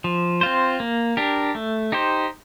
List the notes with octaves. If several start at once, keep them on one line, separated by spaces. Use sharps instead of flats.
F3
C4 F4 C5
A#3
D4 G4 A#4
A3
D#4 G4 C5